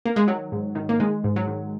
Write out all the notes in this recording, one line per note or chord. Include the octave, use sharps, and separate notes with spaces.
A#3
G#3
D#3 F#3
G#2
D#3
A#3
D#3 G#3
G#2
F#3
D#3